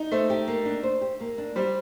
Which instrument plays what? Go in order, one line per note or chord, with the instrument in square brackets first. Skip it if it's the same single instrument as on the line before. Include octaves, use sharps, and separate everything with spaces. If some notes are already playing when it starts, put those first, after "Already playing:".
Already playing: [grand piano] D#4
[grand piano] A3 [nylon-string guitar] C5
[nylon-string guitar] G4
A#3
D4
C5
G4
A#3
D4
[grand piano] G3 [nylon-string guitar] C5